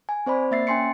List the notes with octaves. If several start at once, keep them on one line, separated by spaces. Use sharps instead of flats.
G#5
C4 C5 D5 B5
A#3 E5 A6 C7
C#4 G5 G#5 C6 C7 C#7